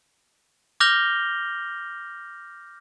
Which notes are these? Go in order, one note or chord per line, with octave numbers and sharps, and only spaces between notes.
D6 F6 G6 A#6 F7 G7